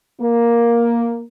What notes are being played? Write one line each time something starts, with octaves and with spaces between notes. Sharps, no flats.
A#3